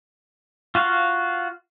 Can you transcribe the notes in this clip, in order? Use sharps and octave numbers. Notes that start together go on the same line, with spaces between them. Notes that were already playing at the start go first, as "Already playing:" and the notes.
F4 F#4 F5